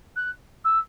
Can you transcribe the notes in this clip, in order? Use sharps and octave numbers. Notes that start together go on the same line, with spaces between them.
F#6
E6